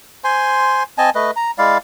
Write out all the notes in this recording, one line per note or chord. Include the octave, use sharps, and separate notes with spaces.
C5 G#5 C6
C4 D#5 G#5 A5
A3 B4 D#5
A#5
G#3 E4 D5 F5